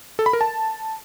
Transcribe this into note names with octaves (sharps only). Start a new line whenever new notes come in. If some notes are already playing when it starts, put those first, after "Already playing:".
A4
B5
A#4
A5